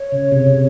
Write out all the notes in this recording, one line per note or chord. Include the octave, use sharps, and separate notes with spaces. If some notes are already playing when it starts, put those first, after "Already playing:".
Already playing: C#5
C#3
C3
C3